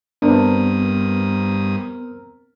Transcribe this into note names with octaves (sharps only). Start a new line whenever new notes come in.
G2 B3 C4 D4 A#4 D#6